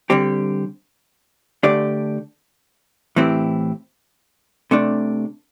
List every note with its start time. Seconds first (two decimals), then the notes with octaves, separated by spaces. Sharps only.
0.10 D3 G3 C4 G4
1.63 D3 A3 D4 G4 D5
3.16 A2 E3 C4 E4 G4
4.71 C3 A3 D4